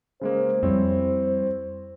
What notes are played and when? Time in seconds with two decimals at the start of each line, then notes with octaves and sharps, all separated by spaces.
0.21 C#3 G#3 A#3 C5
0.63 F2 G3 C4 E4 C#5